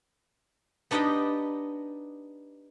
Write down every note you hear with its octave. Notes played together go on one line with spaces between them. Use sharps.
B3 D4 D#4 G4 D#5 G5